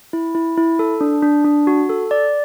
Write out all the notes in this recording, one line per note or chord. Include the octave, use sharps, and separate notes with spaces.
E4
E4
E4
A4
D4
D4
D4
F#4
A4
D5